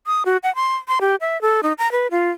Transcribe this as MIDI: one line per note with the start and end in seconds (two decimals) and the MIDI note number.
0.07 0.23 87
0.26 0.37 66
0.43 0.53 78
0.55 0.76 84
0.88 0.99 84
1.01 1.16 67
1.21 1.40 76
1.42 1.61 69
1.63 1.73 63
1.78 1.91 82
1.92 2.07 71
2.11 2.31 65